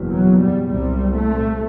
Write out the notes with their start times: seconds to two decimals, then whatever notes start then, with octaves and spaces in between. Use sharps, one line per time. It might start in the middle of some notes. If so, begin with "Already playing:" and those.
Already playing: F#1 E2 B2
0.09 F#3
0.39 G3
0.68 C2 C3 G3
1.14 A3